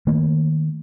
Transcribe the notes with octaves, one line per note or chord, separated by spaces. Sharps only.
D#3 A3 A#3